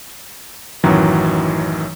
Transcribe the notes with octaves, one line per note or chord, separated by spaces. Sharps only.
A1 F#2 D#3 E3 F#3